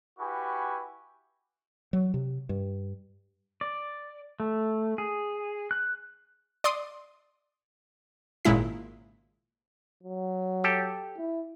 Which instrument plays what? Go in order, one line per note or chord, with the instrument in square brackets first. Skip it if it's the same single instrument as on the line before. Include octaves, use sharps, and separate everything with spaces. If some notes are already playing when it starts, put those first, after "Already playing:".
[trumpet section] E4 F#4 G4 B4 G#5 C#6
[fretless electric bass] F#3
C3
G2
[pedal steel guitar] D5
A3
G#4
F#6
[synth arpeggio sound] D5 C6 D6 D#6
G#1 A#2 C#3 G#3 E4 B6
[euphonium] F#3
[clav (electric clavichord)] G4 A4
[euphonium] E4